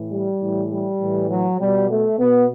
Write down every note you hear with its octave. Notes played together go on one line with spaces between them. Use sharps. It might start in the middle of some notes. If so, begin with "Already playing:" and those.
Already playing: A2 E3
G3
A2 E3
G3
A2 E3
F#3
B2 G3
A3
B2 B3